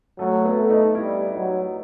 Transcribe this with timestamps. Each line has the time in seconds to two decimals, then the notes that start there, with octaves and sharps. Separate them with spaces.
0.19 F#3 A3
0.45 B3
0.57 A3
0.70 D#4
0.95 G3 E4
1.34 F#3 D#4